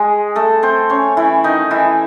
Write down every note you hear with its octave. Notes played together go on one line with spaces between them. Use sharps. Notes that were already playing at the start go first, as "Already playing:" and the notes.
Already playing: G#3 G#4
A3 A4
C4 C5
C#4 C#5
E3 E4
D#3 D#4
E3 E4